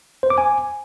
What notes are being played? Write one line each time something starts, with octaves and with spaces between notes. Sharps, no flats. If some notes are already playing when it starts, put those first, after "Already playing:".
C5
D6
G#5